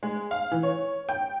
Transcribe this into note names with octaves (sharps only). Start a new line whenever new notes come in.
G#3
F5
E3
C#5
G5